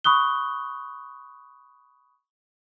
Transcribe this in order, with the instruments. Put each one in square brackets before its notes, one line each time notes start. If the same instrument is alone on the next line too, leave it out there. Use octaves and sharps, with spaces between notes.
[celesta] B5 C#6 D#6 F#6 G7